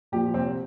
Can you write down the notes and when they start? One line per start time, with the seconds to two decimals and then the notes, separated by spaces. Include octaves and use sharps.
0.12 A#2 F3 G4
0.34 C2 C4